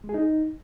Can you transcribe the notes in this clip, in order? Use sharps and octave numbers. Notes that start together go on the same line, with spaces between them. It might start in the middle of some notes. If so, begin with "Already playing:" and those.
G#3
G#4
D#4